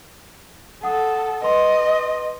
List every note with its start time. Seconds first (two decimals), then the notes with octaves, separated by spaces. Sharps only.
0.83 A4 F#5 D#6
1.43 B4 D#5 C6